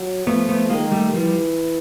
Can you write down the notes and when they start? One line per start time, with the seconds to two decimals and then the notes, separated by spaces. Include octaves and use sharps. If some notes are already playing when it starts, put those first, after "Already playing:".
Already playing: F#3
0.27 F3 A3 B3
0.49 A3 B3
0.70 D#3 G#3 A#3
0.92 G3 A3
1.14 E3 F3 G3